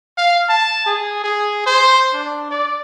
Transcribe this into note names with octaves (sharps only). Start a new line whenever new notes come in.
F5
A5
G#4
G#4
C5
D4
D5